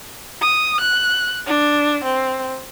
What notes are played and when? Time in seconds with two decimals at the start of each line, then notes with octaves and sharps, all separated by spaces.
0.42 D#6
0.80 F#6
1.47 D4
2.04 C4